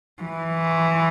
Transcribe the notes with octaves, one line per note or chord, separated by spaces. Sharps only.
E3